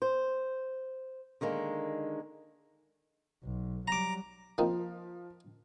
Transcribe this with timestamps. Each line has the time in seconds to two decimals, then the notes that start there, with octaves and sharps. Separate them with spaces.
0.02 C5
1.41 D3 D#3 G#3 A#3
3.44 B1
3.88 F#3 G3 A#5 D6
4.58 F3 A#3 C4 D#4